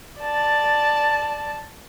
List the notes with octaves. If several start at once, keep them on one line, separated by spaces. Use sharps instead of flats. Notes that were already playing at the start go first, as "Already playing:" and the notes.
D5 A5